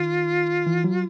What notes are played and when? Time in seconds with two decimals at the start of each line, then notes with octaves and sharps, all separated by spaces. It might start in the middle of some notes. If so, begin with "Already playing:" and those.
Already playing: D#3 F4
0.66 E3
0.84 F#3